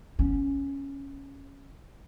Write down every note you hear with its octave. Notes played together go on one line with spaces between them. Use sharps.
B3 C#4